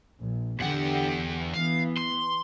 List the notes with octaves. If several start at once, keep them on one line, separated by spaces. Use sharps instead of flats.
A#1
E2 D3 G4 F#5
E3 B3 F5
C6